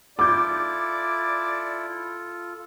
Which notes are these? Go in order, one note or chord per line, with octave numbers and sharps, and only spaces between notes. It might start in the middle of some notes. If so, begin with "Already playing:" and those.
E4 F4 A4 D5 D6 G6